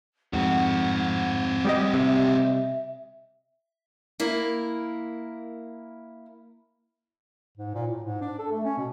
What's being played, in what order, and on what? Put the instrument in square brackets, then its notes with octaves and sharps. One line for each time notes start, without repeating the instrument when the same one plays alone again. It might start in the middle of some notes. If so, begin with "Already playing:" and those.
[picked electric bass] F2 G#2 [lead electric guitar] C4 F#4 [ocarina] F#5
[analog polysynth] G3 G4 D#5 [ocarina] D#6
[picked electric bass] C3 [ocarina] E5
[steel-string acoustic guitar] A#3 E4 A#4
[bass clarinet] G#2
A#2
A2
G#2
D4
A4
A3
C#4
B2